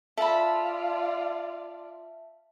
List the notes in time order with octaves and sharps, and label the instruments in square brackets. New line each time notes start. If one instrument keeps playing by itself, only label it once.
[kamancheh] F4 D5 [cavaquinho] A4 B5 [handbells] E5 A5